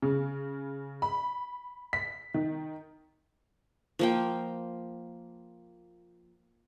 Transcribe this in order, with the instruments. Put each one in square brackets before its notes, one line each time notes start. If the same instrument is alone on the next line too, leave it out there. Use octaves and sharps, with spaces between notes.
[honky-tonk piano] C#3
B5
B6
D#3
[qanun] F3 A#3 G5